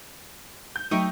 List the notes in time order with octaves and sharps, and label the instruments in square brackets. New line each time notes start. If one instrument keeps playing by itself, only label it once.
[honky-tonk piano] G6
[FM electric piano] F#3 A3 [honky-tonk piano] D#4 E5 [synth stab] G5 C#6 D#6